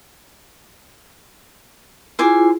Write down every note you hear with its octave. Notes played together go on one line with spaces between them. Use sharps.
E4 F4 G#4 C5 G#5 D6